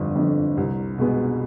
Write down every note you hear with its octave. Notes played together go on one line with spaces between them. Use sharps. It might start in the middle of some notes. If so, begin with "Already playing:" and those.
Already playing: G1 F2 D3
F2 D3
C2
B2 G#3 B3